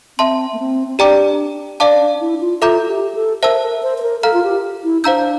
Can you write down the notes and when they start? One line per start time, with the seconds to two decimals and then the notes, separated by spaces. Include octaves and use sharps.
0.18 C4 E5 A5 C6
0.53 A#3
0.59 C4
0.87 C4
0.99 D4 G4 D5 G5 A#5 D6
1.80 D4 D5 F5 A5 D6
2.00 D4
2.20 E4
2.40 F4
2.61 F4 A4 E5 A#5 D6 G6
2.82 F4
2.88 G4
3.15 A4
3.43 A#4 C5 E5 A5 E6
3.62 A#4
3.83 C5
3.98 C5
4.02 A#4
4.22 A4 F5 A#5 F6
4.34 F4
4.44 G4
4.84 E4
5.04 D4 C5 F5 A#5 E6 G6